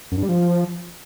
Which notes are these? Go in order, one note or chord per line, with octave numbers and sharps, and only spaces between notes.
F#2
G2
G3
F3